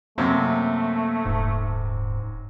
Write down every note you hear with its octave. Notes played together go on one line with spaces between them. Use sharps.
F#2 C3 A3 A#3 C4
D#1 G#2